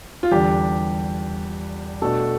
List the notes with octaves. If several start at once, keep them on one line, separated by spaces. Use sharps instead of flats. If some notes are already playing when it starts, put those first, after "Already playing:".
F4
E2 D3 G3 D4 G4
B2 A3 D4 A4